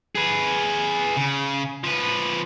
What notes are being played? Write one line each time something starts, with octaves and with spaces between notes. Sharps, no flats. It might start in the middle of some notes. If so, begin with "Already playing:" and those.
G#4 B4
C#3
F3 B4